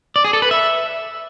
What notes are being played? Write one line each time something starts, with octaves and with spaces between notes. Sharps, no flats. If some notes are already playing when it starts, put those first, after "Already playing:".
D5
G#4
A4
B4
E5